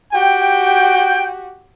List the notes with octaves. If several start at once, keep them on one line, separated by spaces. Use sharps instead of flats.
F#4 G4 G5